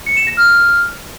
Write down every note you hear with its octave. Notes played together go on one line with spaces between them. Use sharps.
C#7
E7
A#6
F6